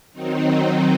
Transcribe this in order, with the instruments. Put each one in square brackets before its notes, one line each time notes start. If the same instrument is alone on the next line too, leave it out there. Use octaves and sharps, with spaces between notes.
[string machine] D#3 F#3 C4 D#4